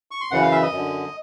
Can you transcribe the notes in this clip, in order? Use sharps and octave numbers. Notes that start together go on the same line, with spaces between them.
C#6
C6
F#2 C#3 E3 F#5
F5
E5
D#5
F#2 D3